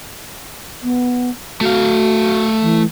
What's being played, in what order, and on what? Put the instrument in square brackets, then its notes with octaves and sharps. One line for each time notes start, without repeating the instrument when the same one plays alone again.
[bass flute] B3
[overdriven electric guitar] A3 F5 [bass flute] F#4
[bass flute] E3